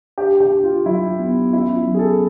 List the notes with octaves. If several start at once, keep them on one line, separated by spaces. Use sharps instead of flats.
D4 G4
G4
D4
F4
F#3 E4
B3
C#4 E4
E4
F#3
G#4
A4